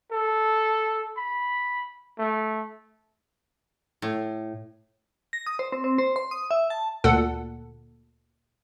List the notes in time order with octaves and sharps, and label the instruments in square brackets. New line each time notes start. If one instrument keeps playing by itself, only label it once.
[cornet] A4
B5
A3
[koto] A2
[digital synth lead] A#6
D#6
C5
C4
C4
C5
C6
D#6
E5
A5
[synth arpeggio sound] D2 A#2 A4 F#5